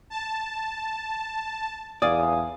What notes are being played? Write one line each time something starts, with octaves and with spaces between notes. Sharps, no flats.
A5
E2 D5 F5 G#5 D#6